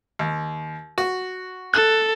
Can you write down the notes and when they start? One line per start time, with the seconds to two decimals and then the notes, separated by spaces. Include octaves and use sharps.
0.19 D#2
0.98 F#4
1.74 A4 F#6